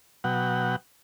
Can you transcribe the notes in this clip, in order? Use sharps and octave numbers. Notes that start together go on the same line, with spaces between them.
B2 F#3 F#5 G5